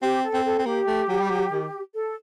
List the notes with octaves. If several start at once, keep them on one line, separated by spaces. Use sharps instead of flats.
C4 G4
A4
C4
A4
C4
A#3 G4
A3
F#3
G3
F#3
D#3
A4